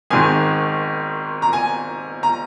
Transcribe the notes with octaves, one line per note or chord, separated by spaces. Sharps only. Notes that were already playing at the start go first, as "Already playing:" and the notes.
G#1 G#2 D#3 G#5
A#5
G#5
A#5